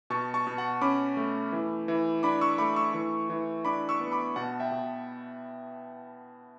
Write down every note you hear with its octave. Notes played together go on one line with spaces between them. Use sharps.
B2 A5 C#6
A5 C#6
B2
F#5 A5
C#4 B5 D6
A3
E3
E3
D4 B5 D6
C#6 E6
A3 B5 D6
C#6 E6
E3
E3
D4 B5 D6
C#6 E6
B3
B5 D6
B2 F#5 A5
E5 G5
B2